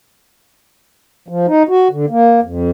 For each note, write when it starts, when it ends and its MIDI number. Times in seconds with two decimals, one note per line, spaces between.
1.28 1.46 53
1.48 1.63 63
1.69 1.88 66
1.91 2.06 50
2.10 2.40 58
2.43 2.71 41